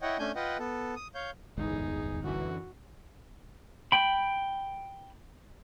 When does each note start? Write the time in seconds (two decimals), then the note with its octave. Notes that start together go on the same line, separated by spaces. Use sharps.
0.02 E4 C#5 D#5 F#5 G5
0.19 A3 C#4 D4 G#5 G6
0.36 F4 B4 D#5 F#5 G5
0.59 B3 A4
0.96 D#6
1.15 C#5 F5 G6
1.57 D1 G1 E2 G#3 D#4 G#4
2.23 F#2 D3 E3 F#4
3.92 G5 B5